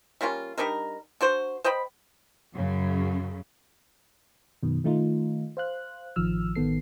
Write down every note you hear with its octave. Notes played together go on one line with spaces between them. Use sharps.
G3 A#3 C#4 F4
G3 D4 D#4 A#4
D4 F#4 C5
C5 D#5 G5 B5
F#2 C#3
F#2 B2 D#3
D#3 A3 D#4 F4
C5 F5 F#6
A1 D#3 F3 E6 F6
A1 D#3 B3 A4 C7